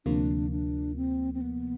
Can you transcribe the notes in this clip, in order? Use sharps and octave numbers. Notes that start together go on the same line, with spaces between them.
D2 C3 F3 A#3 D4
D4
C4
C4
B3